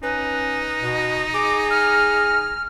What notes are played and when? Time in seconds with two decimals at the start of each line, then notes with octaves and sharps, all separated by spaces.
0.03 C#4 D#4 B4
0.82 B2
1.34 G#4 D6
1.71 F6